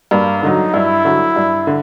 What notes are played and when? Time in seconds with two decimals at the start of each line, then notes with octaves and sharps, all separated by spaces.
0.11 G2 A#3
0.43 D3 F#3 D#4
0.74 G2 E4
1.05 D3 F#3
1.36 G2
1.67 D3